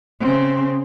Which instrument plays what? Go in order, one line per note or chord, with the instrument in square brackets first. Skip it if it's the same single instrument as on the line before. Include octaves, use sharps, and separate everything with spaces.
[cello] C#3 C4